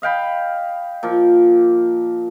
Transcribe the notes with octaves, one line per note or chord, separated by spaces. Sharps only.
D#5 F5 G5 B5
A#2 F3